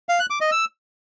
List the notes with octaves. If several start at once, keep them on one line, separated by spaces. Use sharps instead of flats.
F5
F#6
D6
D#5
E6